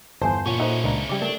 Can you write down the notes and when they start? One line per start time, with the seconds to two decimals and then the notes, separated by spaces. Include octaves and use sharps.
0.21 G1 E2 C5 G#5 A5
0.46 A#2 C#4 E4 C#5 F#5 C#6
0.59 D#4 F#4 A4 C5 E5 F#5
0.84 C#2 D4 A#5
1.09 C#3 G3 D5 G5 D6
1.22 A3 D4 A#4